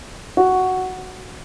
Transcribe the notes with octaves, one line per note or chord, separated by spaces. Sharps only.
F#4